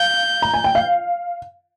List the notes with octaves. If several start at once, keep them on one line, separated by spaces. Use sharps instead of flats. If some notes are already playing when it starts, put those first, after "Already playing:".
Already playing: F5 G6
A#5
G#5
G5
F5